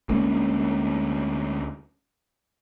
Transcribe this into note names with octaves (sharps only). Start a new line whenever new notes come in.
D2 G#3 A#3 C#4